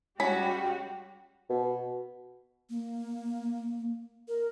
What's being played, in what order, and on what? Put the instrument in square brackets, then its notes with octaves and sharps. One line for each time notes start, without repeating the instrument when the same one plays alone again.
[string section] G3 G4 [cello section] G#3 F#4 [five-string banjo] C#4 B5
[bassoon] B2
[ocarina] A#3
A#4